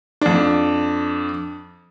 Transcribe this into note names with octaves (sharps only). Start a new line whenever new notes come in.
F2 D4